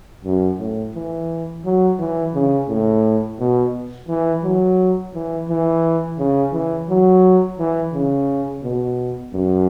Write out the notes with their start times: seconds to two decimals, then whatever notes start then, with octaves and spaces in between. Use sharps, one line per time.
0.25 F#2
0.59 A2
0.95 E3
1.65 F#3
1.99 E3
2.34 C#3
2.69 A2
3.40 B2
4.08 E3
4.43 F#3
5.14 E3
5.49 E3
6.19 C#3
6.53 E3
6.89 F#3
7.59 E3
7.93 C#3
8.63 B2
9.33 F#2